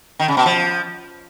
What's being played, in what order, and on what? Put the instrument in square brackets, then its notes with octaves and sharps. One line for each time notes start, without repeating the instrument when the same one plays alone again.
[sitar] D#3
C#3
B2
F3